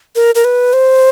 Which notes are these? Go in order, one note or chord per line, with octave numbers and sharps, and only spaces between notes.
A#4
A#4
B4
C5